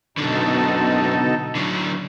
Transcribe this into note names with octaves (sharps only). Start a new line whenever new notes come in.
F#2 B2 D3 D#4 A4
D3 F#3